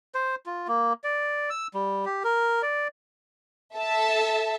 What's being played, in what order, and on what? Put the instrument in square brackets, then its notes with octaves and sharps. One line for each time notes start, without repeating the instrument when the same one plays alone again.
[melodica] C5
F4
A#3
D5
E6
G3
G4
A#4
D5
[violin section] A4 E5 A5